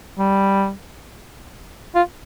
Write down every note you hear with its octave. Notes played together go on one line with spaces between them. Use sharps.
G3
F4